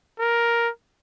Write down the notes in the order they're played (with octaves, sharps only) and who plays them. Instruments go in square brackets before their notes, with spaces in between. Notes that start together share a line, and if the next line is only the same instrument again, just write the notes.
[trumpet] A#4